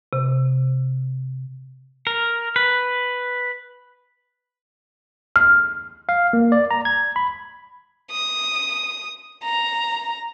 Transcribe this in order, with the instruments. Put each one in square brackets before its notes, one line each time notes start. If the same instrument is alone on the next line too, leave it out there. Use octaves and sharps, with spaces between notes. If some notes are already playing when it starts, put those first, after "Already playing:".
[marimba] C3
[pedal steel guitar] A#4
B4
[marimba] F6
[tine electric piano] F5
A#3
D5
A#5
G#6
B5
[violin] D#6
A#5